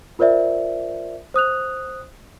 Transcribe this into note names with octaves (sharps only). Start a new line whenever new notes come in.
F4 A#4 C5 D5 E5
C5 D#6 F#6 F7